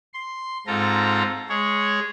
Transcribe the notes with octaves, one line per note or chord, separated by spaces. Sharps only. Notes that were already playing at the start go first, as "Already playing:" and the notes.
C6
G#2 C4 F4 A4 A#5
G#3 G#4 C#5